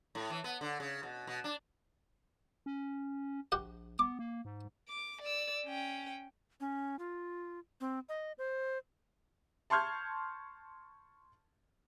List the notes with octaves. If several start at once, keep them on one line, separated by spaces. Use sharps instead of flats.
A2
E3
B3
D3
C#3
B2
B2
D4
C#4
A#1 F#4 G4 F#5
B3 D6
A#3
G#2
D6
D5 E6
C#4 G5
C#4
F4
C4
D#5
C5
A5 C6 C#6 F6 G6 G#6